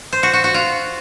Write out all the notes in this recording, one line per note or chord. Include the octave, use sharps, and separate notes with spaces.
C5
F#4
F#4
F#4
F4